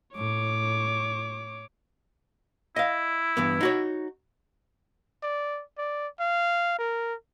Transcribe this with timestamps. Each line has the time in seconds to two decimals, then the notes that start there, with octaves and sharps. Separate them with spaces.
0.15 A2 C#5 D6
2.76 E4 D#5 F5
3.37 G2 E3 B3
3.61 D#4 F#4 C#5
5.23 D5
5.78 D5
6.20 F5
6.79 A#4